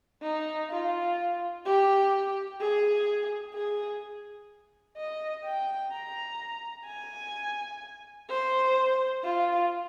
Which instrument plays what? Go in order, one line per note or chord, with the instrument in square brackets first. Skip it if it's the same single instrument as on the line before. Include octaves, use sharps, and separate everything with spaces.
[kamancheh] D#4
F4
G4
G#4
G#4
D#5
G5
A#5
G#5
C5
F4